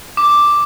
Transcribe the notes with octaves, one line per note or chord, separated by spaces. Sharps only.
D6